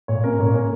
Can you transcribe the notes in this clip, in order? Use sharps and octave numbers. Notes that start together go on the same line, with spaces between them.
A#2 C#5
A#3 C#4 A#4
A#2 C#5
A#3 C#4